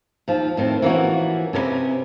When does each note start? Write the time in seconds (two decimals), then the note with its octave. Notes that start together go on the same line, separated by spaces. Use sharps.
0.28 D#2 F3
0.57 A2 D#3 C4
0.82 E3 F3 A#3 B3 C#4 F#4
1.53 C3 C#4 A#4 B4 D#5